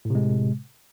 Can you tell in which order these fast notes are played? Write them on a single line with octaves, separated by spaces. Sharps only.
A2 C3 G#3